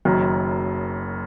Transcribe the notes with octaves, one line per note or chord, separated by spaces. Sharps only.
F#1 F#2 D#3